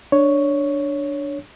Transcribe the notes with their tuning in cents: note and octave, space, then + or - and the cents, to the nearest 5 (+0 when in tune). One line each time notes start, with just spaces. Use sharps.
D4 +0 C#5 +5